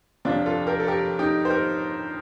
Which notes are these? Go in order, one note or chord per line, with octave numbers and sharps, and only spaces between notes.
G1 F2 C3 F3 D4 F4
F4 A4
G4 A#4
A4
G4 A#4
D#4 G4
C5
G4 A#4